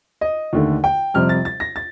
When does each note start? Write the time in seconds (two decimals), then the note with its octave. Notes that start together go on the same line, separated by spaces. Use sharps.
0.21 D#5
0.53 D#2 D3 A3
0.84 G5
1.14 F2 C3 G3 C4 F6
1.29 A6
1.45 A6
1.60 A#6
1.76 A6